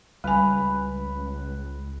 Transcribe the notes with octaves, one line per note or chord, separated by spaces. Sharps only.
C#2 G3 B4 G#5